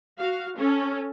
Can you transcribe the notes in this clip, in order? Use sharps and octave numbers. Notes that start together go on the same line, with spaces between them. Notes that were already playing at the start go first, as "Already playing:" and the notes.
F#4 F5
C#4 A4